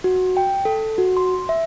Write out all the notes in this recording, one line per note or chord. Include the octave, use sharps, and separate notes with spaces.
F#4
G5
A4
F#4
C6
E5